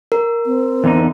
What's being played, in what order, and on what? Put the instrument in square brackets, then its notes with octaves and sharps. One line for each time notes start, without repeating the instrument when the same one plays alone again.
[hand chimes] A#4
[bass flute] C4
[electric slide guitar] E2 D3 D#4